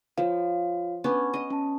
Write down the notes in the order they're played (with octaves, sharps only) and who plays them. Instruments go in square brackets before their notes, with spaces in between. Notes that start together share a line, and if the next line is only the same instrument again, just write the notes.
[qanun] F3 [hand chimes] F4 C#5 F5
[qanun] B3 C#4 D4 [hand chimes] F#5
[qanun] D#5
[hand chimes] C#4 A5